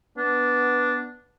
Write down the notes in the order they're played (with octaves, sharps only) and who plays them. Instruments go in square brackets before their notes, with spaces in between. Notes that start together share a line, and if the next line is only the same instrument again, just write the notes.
[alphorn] B3 [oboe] D4